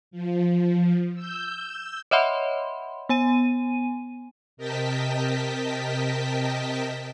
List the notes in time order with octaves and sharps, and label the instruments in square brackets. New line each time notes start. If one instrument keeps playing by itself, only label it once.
[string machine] F3
E6 G6
[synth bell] C#5 D#5 E5 F#5 B5 C6
B3 G#5 D#7
[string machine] C3 A#4 D#5 G5 A5 B6